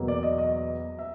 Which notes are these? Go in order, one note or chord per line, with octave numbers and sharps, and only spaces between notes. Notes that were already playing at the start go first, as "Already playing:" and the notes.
Already playing: E2 B2 F#3 A#3
D5
D#5
D#5
E5